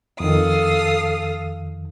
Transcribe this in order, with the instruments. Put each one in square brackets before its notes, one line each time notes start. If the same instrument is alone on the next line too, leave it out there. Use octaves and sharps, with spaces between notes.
[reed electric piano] F2 D#3 [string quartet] A4 F5 D#6